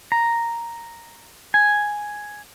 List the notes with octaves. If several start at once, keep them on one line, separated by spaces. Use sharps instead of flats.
A#5
G#5